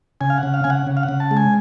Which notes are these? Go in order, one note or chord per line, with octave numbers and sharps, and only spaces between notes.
C#3 G#5
F5
F#5
C#3
F5
C#3 G#5
F#5
C#3
F5
F#5
C#3
A5
G#3
G#5